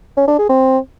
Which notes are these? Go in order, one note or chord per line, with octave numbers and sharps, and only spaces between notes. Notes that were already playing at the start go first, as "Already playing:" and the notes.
C#4
D4
G#4
C4